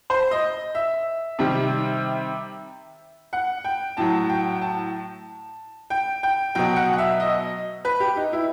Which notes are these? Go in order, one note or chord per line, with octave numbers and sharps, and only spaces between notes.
C5
D#5
E5
C3 D#3 G3
F#5
G5
A2 F#3 A5
G5
A5
G5
G5
B2 F#3 G5
F#5
F#5
E5
D#5
B4
G4
D#4
E4